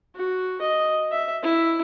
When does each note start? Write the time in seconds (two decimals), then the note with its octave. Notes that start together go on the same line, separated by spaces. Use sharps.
0.16 F#4
0.61 D#5
1.12 E5
1.43 E4